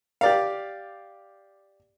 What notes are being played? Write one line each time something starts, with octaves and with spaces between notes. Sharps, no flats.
G4 D5 F5